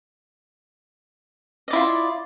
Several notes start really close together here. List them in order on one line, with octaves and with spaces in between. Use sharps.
D#5 D5 E4 F4